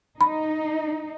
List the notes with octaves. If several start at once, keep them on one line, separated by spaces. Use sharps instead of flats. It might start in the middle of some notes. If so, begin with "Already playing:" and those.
D#4 B5